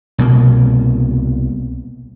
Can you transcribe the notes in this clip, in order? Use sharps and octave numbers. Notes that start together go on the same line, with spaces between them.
C2 B2 A#3